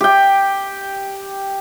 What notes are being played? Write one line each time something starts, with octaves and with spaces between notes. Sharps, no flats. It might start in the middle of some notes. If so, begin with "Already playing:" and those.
G4 G5